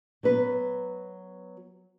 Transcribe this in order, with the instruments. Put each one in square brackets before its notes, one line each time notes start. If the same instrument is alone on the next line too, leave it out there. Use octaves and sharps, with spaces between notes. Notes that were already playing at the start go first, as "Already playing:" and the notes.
[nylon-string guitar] F#3 B3 B4